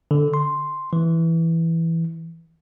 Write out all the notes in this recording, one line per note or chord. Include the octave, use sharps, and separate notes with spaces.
D3
C6
E3